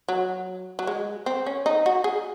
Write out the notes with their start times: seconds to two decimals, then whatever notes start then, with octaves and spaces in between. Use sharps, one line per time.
0.09 F#3
0.79 F#3
0.87 G#3
1.26 C4
1.46 C#4
1.66 D#4
1.86 F#4
2.04 G#4